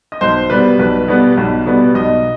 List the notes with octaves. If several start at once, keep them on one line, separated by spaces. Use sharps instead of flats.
D#5
B1 C5
B2 G3 B3 B4
B1 B4
B2 G3 B3
B1
B2 G3 B3
B1 D#5